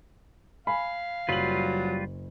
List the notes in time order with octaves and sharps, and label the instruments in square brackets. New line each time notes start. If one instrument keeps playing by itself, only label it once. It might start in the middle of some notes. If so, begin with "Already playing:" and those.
[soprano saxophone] F5 [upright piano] G#5 B5
[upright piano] F#1 F#7 [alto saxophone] F#3 [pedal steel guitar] G3 F4 B4